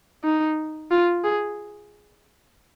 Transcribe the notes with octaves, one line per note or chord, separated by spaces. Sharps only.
D#4
F4
G#4